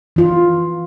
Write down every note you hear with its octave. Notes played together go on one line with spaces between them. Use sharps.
E3 F4